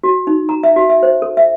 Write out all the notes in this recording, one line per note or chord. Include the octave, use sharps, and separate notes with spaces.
F#4
D#4
A#5
E5
F#4
E5
C5
A4
E5